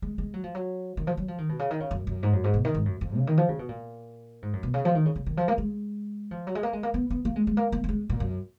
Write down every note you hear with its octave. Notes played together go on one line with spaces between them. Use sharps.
G#3
G#3
F#3
F3
F#3
D#3
F3
F#3
F3
D#3
B2
C#3
D#3
C#3
F#2
F#2
G#2
F#2
G#2
B2
D#3
G#2
F#2
F2
C#3
D#3
F3
C#3
B2
A#2
G#2
F#2
B2
C#3
F3
D#3
C#3
C#3
D#3
F3
A#3
G#3
F3
F#3
G#3
A#3
G#3
A#3
B3
B3
A#3
G#3
G#3
A#3
A#3
A#3
G#3
A#2
F#2